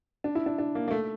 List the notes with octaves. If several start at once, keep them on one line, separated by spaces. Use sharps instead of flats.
D4
E4
D4
D4
A#3
A#3
A3